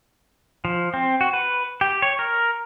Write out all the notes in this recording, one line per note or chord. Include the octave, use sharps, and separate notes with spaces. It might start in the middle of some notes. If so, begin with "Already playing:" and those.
F3
C4
F#4
B4
G4
C#5
A#4